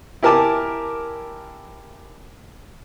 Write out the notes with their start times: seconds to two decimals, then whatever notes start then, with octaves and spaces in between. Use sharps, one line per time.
0.23 E4 G4 A#4 G#5 A5 D6